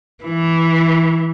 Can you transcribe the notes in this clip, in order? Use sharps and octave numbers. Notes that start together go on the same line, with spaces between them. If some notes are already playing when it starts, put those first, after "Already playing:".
E3